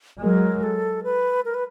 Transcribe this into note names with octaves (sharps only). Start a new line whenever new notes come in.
F#3 G#3 A#4
A4
B4
A#4
B4